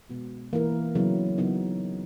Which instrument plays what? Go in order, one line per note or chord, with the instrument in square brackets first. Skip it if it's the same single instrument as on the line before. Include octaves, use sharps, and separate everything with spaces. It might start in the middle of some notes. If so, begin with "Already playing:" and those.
[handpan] B2 G#3 B3 F#4
E3 A#3 E4 A#4
C#3 F#3 B3 E4
C#3 F#3 B3 D#4